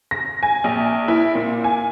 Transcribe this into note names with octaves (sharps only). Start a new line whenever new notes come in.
A#6
G#5
A#1
E4
A#2
G#5